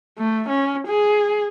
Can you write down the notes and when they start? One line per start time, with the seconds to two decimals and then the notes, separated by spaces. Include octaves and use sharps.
0.18 A3
0.48 C#4
0.88 G#4